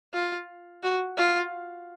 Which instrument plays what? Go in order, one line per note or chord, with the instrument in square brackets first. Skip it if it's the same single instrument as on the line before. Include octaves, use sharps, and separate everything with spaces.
[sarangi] F4
F#4
F4